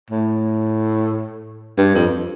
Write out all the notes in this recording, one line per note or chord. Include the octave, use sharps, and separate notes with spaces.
A2
G2
F2